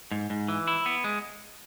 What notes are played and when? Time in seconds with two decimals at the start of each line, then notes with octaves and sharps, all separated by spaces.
0.11 G#2
0.30 G#2
0.48 E3
0.67 E4
0.86 B3
1.04 G#3